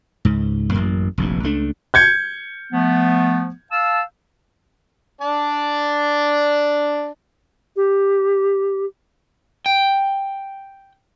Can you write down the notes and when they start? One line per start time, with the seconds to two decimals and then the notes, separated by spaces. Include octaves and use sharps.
0.25 C#2 G#2
0.72 A1 F#2 A#3
1.18 F1 A#1 G2
1.43 C#2 A3 D4
1.94 G6 G#6 C#7
2.73 F3 A3 B3
3.71 F5 A5 E6
5.21 D4 D5 A5
7.76 G4
9.66 G5